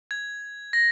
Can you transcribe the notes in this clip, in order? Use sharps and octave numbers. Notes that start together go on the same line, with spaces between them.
G#6
A#6